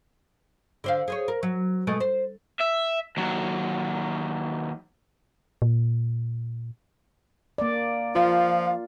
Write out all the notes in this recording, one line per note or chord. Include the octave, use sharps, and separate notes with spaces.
D3 C5 F5
G#4 C5 C#5
A#4
F#3
B2 G#3 A3
C5
E5
D#2 F#3
A#2
A#3 D5
F3 F4 F5